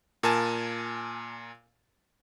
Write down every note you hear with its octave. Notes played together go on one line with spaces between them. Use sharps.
A#2 A#4 G#5 A5